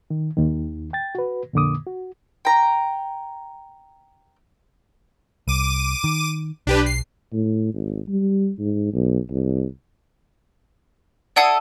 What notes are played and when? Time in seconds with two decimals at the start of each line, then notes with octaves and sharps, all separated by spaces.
0.10 D#3
0.37 D#2 D#3
0.93 G5 A6
1.15 F#4 B4
1.53 F2 A#2 D3 A#3 D6 D#6
1.87 F#4
2.45 G5 A#5
5.48 C2 D6 D#7
6.04 D#3
6.67 B1 D4 G4 B4
6.86 C7
7.33 A2
7.74 G#1
8.08 G3
8.59 G#2
8.93 B1
9.30 C2
11.36 E4 A4 D5 F#5 D#6 C7